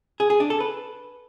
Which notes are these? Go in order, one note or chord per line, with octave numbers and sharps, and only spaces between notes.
G#4
G#4
D4
A4
B4